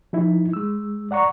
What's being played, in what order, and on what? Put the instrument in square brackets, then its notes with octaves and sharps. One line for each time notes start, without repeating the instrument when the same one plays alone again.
[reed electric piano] F3 D#4 E4
G#3 E6
D5 F#5 A#5 C#6